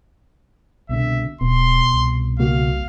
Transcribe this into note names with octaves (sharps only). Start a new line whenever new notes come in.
C2 B2 D3 E5
D1 B2 C6
C2
C#3 A#3 F#4 F5